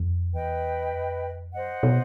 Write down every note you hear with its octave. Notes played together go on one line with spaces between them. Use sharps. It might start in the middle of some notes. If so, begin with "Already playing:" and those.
Already playing: F2
E2 B4 D#5 G5 B5
F2
F#2 C5 D#5 F#5
B2